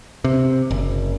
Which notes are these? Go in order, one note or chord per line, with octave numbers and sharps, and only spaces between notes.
C3
F#1